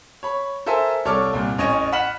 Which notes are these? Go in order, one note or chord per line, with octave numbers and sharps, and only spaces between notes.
C#5 B5
A4 A#4 C5 E5 G#5
C2 A4 C#5 D5 D6 F6
C2 A#2
A1 C#4 C#5 D#5 G#5 D#7
F#5 B5 F6 B6 E7 F#7